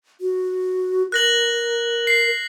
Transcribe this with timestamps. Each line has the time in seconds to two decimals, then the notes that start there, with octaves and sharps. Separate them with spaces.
0.21 F#4
1.12 A#4 F#6 A#6 F#7
2.07 C7